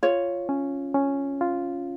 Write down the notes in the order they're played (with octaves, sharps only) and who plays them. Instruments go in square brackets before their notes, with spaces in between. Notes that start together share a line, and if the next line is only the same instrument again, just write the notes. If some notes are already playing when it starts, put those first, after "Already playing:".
[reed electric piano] F4 [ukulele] C#5
[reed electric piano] C#4
C#4
F4